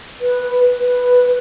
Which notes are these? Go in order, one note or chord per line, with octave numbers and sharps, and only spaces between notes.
B4
B4